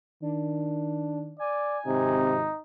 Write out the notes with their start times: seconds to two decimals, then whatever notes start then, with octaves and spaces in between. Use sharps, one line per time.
0.22 D#3 D4
1.39 D5 G#5
1.87 G#1 C3 D#4